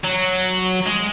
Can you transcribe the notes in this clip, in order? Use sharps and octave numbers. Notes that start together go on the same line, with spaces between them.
F#3
G#3